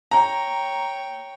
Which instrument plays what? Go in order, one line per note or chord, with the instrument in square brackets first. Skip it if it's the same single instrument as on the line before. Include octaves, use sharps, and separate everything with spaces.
[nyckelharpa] C#5 G5 [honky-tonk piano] A#5